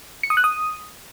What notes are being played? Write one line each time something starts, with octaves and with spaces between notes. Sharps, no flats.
C#7
D#6
F#6
D#6